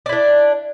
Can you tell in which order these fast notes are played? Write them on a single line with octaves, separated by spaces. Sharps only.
D5 E4 D4